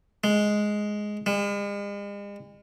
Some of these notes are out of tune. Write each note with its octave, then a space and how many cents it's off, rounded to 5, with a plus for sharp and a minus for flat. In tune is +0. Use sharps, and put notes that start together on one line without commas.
G#3 +5
G#3 -45